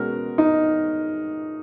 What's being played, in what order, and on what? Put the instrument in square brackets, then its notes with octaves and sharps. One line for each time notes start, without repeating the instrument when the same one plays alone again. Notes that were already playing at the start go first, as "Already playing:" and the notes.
Already playing: [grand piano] B2 G#3 C#4 F#4 [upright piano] A#4
[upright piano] D#4